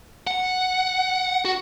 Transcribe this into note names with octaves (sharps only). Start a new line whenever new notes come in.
F#5
F#4